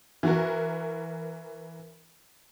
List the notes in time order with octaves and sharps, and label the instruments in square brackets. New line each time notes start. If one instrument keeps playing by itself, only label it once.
[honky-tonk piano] E3 F#4 A#4